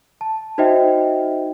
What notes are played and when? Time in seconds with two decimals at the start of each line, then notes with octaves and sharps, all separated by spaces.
0.21 A5
0.58 D#4 F#4 C5 D#5 E5 G5